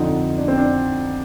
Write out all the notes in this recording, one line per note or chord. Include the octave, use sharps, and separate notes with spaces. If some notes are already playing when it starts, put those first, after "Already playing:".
Already playing: F2 D3 F3 D#4
D4
C4
D4